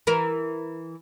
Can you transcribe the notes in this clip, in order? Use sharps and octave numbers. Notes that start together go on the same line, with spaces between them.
E3 A#4